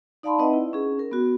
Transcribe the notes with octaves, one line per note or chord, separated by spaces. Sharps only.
D#4 D5 F5 A5 B5 C6
C4 D#4 B4 D#5 E5 F#5
E4
C#4 G#4
A#4
B3 F#4